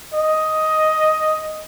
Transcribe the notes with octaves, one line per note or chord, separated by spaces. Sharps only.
D#5